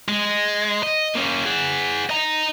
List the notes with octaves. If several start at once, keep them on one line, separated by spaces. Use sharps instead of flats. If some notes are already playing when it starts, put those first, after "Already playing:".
G#3
D#5
A#3 C#4
G#4 F#5
D#5 A#5